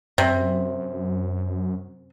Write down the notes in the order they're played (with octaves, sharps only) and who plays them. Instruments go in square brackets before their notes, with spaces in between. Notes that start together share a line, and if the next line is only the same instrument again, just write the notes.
[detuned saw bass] F#2 [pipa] C3